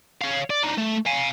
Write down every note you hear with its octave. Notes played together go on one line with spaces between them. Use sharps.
C#5 F5
D5
D4 D#4
A3
F5 G#5